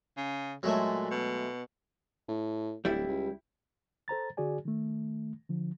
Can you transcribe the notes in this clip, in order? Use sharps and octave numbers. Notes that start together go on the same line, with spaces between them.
C#3
A#2 F#3 G#3 A3
B2
A2
D1 G3 E4
C#2
A4 C5 A#5 A6
D3 F#4 G#4 D5 G#5
D#3 A3
D3 F3